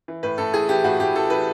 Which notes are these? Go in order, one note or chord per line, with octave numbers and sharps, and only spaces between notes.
E3
A2 B4
A2 A4
E3 G#4
E3 G4
A2 F#4
A2 G4
E3 A4
E3 B4